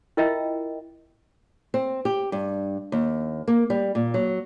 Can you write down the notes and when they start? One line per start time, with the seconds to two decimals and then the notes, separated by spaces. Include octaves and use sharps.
0.17 E4 F4 A#4 D#5 E5 G5
1.74 C4
2.05 G4
2.32 G2
2.92 D#2
3.48 A#3
3.70 G3
3.95 A#2
4.14 F#3